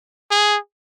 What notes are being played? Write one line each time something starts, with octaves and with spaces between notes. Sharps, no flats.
G#4